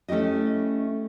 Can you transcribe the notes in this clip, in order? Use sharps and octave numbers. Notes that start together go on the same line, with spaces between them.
A3 C#4 E4 G4 D#5